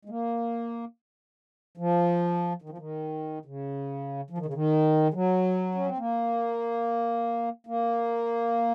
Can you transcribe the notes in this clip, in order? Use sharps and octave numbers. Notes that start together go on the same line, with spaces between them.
G#3
A#3
F3
D#3
F3
D#3
C#3
F3
D#3
C#3
D#3
G#3
F#3
C#4
C4
A#3
A#3